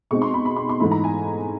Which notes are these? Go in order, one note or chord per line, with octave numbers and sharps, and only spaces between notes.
B2 G#3 C4 D#4 C#6
C6
B5
B5
C6
C6
G#2 E3 A3 B5
A#5
G#5